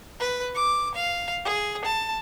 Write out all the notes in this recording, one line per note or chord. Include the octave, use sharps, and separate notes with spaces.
B4
D6
F5
G#4
A5